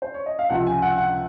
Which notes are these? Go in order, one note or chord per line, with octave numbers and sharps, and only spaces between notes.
C5
C#5
D#5
F5
C#2 C3 F3 F#5
G#5
F#5
F#5